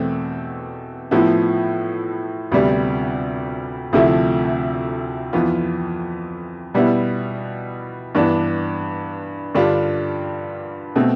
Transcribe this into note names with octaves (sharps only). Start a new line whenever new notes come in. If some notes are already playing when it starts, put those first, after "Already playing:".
Already playing: E2 B2 A3 C4
A2 F3 B3 E4
D2 C3 G3 B3
D2 C3 F3 A3 E4
F2 E3 B3 F4
B2 G3 B3 E4
G2 E3 B3 D4
G2 D3 G3 D4 F4
B2 A3 C4